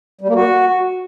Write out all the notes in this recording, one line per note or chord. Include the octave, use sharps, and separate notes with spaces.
G3
A#3
F#4